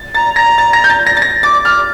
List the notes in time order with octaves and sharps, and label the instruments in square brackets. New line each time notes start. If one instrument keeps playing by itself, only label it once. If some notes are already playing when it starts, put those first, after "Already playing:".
Already playing: [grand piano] A6
[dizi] A#5 [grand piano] A6
[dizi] A#5 [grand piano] A#6
[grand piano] A6
A#6
G6
A6
A#6
A6
A#6
[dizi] D6 [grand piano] A6
[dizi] D6 [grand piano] F6